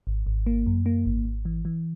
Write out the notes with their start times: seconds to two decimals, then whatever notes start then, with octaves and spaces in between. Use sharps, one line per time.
0.07 G#1
0.27 G#1
0.46 A#3
0.66 F#2
0.86 A#3
1.06 G#1
1.25 G#1
1.45 E3
1.65 E3